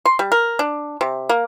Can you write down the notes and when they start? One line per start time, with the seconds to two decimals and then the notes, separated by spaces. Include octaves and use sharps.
0.05 C6
0.19 G3
0.32 A#4
0.59 D4
1.01 C3
1.29 A#3